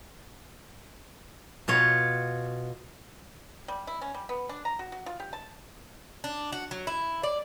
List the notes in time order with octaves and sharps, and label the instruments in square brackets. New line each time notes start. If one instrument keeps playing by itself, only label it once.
[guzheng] B2 F4 C#5
[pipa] G3
E4
C#4
G3
B3
D4
A#5
F#4
F#4
F4
G4
A5
[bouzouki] D4
F#4
F#3
E4
D5